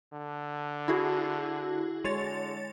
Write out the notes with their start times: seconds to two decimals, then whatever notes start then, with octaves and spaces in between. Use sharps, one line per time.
0.13 D3
0.88 E4 F#4 G#4
2.05 D3 G#3 C#5 A6